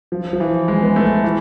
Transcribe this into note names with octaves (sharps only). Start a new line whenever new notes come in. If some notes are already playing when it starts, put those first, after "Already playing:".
F3
F3
E3
G#3
B3
A3
E3